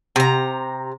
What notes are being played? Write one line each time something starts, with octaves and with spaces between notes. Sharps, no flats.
C3 A#5